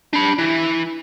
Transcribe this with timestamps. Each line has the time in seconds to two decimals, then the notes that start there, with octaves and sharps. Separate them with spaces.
0.13 D4 B5
0.38 E3